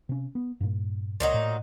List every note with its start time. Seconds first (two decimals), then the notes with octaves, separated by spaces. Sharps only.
0.09 C3 C#4
0.35 B3
0.61 G2 A#2
1.20 C#2 A#2 F#3 D#4
1.34 A2